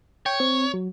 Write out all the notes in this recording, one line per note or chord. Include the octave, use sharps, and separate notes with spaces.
C#5 G5
C4
F#3